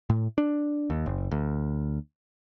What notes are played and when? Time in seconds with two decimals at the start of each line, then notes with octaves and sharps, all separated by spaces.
0.10 A2
0.38 D4
0.90 D#2
1.06 F#1
1.31 D2